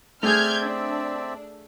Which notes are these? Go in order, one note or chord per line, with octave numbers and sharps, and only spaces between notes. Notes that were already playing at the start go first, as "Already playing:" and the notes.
A3 C4 G#4 D5 E5 F6 G6 G#6
D4